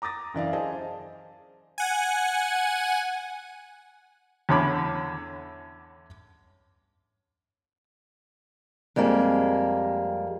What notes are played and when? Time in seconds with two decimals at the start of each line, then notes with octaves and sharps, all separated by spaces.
0.02 A#5 D6 D#6 A6 A#6
0.34 F#2 E3 D5 F5
0.53 G#4 C5 D#5 G#5 A5
1.78 F#5 G#5
4.49 E2 A2 D3 C#4 B5 D6
8.96 F2 G3 G#3 A#3